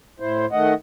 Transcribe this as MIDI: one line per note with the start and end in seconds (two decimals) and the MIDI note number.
0.20 0.46 45
0.20 0.46 64
0.20 0.46 72
0.52 0.74 51
0.52 0.74 57
0.52 0.74 75
0.52 0.74 78